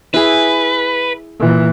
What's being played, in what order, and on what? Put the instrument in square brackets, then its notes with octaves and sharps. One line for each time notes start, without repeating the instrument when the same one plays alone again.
[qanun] E4 G#4 [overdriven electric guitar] B4
[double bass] A#2 E3